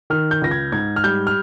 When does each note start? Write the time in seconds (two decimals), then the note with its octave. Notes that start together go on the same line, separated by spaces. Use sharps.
0.10 D#3 F6
0.31 G6
0.41 C#2 A#6
0.51 G#6
0.72 G#2 G#6
0.96 F6
1.04 G3 G6
1.27 F6